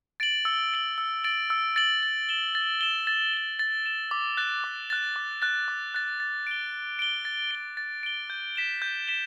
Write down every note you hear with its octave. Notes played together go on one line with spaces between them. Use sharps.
A6 D7 F#7
E6
A6 D7 F#7
E6
A6 D7 F#7
E6
A6 D7 F#7
A6
E7 G7
A6
E7 G7
A6
E7 G7
A6
E7 G7
D6
F#6 A6
D6
F#6 A6
D6
F#6 A6
D6
F#6 A6
A6
D7 G7
A6
D7 G7
A6
D7 G7
A6
D7 G7
G6
B6 E7 G7
G6
B6 E7 G7